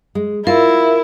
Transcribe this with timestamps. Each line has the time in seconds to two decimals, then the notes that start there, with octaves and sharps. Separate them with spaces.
0.15 G#3
0.47 E4 F4 A#4